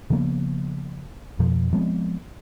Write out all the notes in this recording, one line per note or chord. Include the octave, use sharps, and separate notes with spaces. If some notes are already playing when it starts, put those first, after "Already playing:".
C#3 F3 A#3 B3
F2 B2 F3
F3 G#3 B3 C4